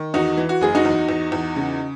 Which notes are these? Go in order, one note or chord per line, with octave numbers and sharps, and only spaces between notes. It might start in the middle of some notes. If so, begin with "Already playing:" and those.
Already playing: D#3
E2 D#4 F#4
E3
F#4
F#1 G#4
D#4 F#4
E2
E2
E2
C#3